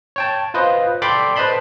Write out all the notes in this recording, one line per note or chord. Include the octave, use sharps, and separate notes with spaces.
C#5 G5 A5
F4 B4 C5 D#5
A4 D5 G5 B5 C6 D6
B4 C5 D#5 A5 B5 C6